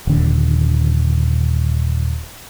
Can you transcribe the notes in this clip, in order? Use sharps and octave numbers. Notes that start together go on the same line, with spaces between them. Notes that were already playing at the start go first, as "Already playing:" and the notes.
D#1 D3